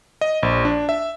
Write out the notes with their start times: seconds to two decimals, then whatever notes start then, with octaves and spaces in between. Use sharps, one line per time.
0.21 D#5
0.43 A#1
0.65 D4
0.89 E5